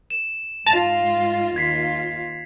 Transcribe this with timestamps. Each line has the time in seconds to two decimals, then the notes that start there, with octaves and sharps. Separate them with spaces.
0.10 E7
0.66 G#2 F4 A5 A#6 F7
1.56 D#2 F4 G#6 B6 C7